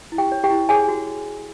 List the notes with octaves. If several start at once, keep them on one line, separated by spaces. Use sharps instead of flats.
E4
G4 G5
C#5
G4 G5
E4
G#4 C#5 G#5
F#4